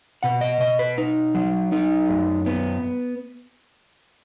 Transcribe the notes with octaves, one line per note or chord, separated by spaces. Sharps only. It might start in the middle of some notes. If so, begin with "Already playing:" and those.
B2 F#5
D#5
B2 D#5
B4
D#4
F#3
D#4
F#2
B3